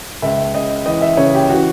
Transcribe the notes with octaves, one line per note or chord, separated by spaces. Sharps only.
C#2 E5
C#3 D#5
E3 D#5
E5
C#3 C#5
G4
E3 F#4